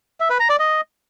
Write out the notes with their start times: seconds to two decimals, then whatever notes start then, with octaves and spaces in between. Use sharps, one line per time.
0.20 E5
0.30 B4
0.40 A#5
0.50 D5
0.59 D#5